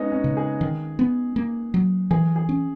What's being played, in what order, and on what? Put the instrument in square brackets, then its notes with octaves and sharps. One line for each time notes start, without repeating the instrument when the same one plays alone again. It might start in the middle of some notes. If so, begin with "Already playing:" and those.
Already playing: [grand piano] G#3 B3 C#4 D#4
C#4
[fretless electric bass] C#3
[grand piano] G#4
[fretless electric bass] D#3
B3
A#3
F#3
[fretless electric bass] E3 [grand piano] G#4
[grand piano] G#4
[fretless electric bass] C#4